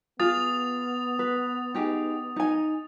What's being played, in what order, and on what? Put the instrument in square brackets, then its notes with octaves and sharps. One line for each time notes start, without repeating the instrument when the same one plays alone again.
[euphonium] B3 [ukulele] F4 G#4 [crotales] D#6 A6 F7
[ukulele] B4
D#4 G4 G#4
D#4 G#5